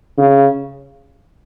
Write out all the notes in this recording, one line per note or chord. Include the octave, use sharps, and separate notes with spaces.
C#3